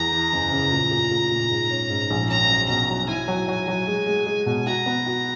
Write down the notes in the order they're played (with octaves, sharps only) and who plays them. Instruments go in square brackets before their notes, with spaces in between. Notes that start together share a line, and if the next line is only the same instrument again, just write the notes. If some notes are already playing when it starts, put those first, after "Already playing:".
Already playing: [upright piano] E2 [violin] A#5
[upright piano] E3
F#1
C#3
A#2
A#2
A#2
A#2
G#2
C#4
G#2
A#1
[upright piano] C#4 [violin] A#5
[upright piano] F#3
[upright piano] B2 [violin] A#5
[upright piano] F#3
[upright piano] E4 [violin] G#5
[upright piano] F#3
F#3
F#3
G#3
G#3
G#3
B2
[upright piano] F#4 [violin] A#5
[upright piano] B3
F#4